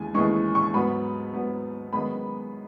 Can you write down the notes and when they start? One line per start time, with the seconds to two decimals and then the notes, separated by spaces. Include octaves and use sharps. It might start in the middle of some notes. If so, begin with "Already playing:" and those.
Already playing: D#2 C#3 E3 G#3 G#5
0.14 D#2 C#3 E3 G#3 C#6
0.55 C#6
0.74 G#2 F#3 B3 B5
1.33 G#2 F#3 B3
1.93 F#2 D#3 G#3 B3 B5